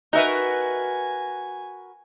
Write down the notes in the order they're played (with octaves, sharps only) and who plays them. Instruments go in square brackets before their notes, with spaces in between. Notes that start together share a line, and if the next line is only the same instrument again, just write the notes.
[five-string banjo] D#4 E5 [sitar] F#4 A#4 B4 [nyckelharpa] G#5